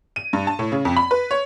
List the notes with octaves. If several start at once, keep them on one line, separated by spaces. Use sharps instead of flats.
D#7
G2
A5
A2
C#3
F2
B5
B4
C#5